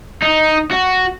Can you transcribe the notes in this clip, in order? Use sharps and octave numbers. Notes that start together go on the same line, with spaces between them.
D#4
F#4